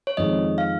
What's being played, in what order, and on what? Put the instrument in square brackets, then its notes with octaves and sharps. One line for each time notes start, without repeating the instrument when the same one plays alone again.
[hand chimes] C#5
[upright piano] F2 D#3 G#3 [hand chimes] D#5
[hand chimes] F5